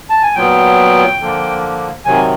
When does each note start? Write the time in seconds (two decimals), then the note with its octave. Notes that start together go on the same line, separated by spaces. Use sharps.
0.10 A5
0.22 G#5
0.35 A#2 F#3 B3 G5
1.20 D3 F3 A#3
2.05 C3 D#3 F#3 G#5